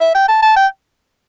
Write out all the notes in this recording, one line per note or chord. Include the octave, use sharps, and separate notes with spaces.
E5
G5
A5
A5
G5